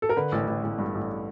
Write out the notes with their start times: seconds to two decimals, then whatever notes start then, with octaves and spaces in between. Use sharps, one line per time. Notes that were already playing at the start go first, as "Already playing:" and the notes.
0.02 A4
0.09 A#4
0.16 D3 B4
0.32 A1
0.48 A1
0.63 A1
0.78 G2
0.95 A1